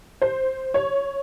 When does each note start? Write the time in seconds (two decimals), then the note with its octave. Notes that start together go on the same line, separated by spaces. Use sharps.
0.22 C5
0.74 C#5